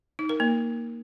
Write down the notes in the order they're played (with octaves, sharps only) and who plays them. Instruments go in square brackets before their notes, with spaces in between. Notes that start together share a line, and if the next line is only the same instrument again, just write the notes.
[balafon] D#4
A#4
A#3